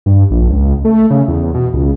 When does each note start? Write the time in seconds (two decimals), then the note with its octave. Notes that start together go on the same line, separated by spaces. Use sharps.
0.06 G2
0.30 A#1
0.50 C#2
0.85 A3
1.10 C#3
1.28 E2
1.54 B2
1.74 C#2